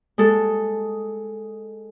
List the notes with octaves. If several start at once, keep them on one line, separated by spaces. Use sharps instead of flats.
G#3 A4